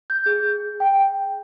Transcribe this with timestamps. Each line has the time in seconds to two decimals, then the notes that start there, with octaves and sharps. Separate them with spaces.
0.10 G6
0.26 G#4
0.80 G5